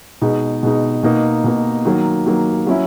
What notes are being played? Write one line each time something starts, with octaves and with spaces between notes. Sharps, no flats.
B2 G#3 D#4
B2 G#3 D#4
B2 A#3 D#4
B2 A#3 D#4
D#3 F#3 A#3
D#3 F#3 A#3
F#3 C#4 E4